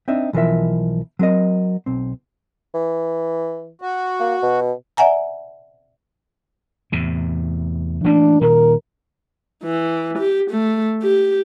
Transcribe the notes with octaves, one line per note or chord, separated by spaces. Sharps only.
C4 D4 D#4 E5
B1 E3 F3 A#4 E5
F#3 C4 A#4 D#5
B1 C4
E3
F#4
A#3
B2
D5 E5 F#5 G#5 A#5
E2 A2 C3
E3 A3 A#3 D4
A#2 D#3 A#4
E3
G4
A3
G4